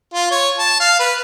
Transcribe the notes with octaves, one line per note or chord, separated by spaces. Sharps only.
F4
C#5
A5
F5
B4